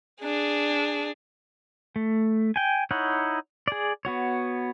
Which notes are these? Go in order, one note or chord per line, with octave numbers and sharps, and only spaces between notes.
D4 G#4
A3
G5 G#5
D#4 E4 C#5 F#5
G#4 D5
B3 F#4 C#5